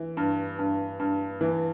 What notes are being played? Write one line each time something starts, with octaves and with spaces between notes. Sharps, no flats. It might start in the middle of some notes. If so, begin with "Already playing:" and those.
Already playing: E3
G2
G2
G2
E3